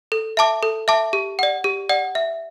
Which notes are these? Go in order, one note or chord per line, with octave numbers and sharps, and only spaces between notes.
A4
E5 A5 D6
A4
E5 A5 D6
G4
D5 F#5
G4
D5 F#5
E5